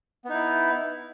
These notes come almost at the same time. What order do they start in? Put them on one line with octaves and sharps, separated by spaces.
B3 D#4 E4